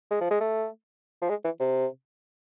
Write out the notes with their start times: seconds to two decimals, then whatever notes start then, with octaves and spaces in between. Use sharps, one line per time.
0.11 G#3
0.21 F3
0.31 G#3
0.40 A3
1.22 F3
1.29 G#3
1.45 E3
1.60 C3